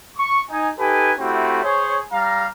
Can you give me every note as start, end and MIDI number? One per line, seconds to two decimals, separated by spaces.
0.17 0.42 85
0.50 0.68 63
0.50 0.68 80
0.79 1.12 63
0.79 1.12 67
0.79 1.12 69
0.79 1.12 71
0.79 1.12 80
1.19 1.63 57
1.19 1.63 60
1.19 1.63 64
1.19 1.63 66
1.19 1.63 67
1.64 1.99 68
1.64 1.99 72
1.64 1.99 73
2.12 2.46 55
2.12 2.46 77
2.12 2.46 82